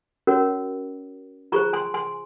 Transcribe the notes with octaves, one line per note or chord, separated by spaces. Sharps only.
C#4 F#4 A#4 C#5
F4 G#4 C5 A#5 C#6
G#5 C6
G#5 C6